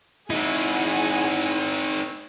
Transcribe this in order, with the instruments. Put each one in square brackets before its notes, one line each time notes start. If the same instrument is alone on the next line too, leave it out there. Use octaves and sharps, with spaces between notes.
[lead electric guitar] C4 D#4 [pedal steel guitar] E4 [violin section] G#4 F#5 G#5